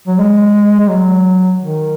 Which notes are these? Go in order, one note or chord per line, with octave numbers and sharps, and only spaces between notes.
F#3
G#3
G#3
F#3
D#3